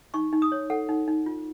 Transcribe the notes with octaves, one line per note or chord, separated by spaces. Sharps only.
D#4 C#6
D#4
D#6
C#5
A4 F#5
D#4
D#4
F4